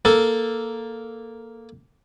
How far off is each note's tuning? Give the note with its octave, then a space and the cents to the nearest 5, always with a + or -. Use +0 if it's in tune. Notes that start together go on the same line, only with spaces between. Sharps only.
A#3 +0 A4 +0